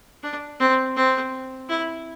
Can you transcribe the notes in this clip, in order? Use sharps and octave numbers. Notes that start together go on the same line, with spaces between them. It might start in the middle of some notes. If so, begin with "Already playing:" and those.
D4
C4
C4
E4